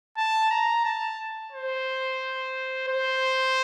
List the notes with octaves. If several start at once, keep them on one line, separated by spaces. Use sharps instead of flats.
A5
A#5
A5
C5
C5